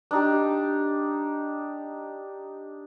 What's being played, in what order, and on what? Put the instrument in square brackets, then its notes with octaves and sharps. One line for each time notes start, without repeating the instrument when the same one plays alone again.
[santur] D4 D#4 G4